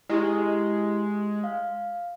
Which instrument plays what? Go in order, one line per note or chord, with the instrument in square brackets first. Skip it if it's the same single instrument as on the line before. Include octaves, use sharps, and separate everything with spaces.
[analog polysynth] G#3 [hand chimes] E4 G4
[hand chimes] F5